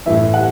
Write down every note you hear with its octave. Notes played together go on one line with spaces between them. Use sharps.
A2 E3 E5
F#5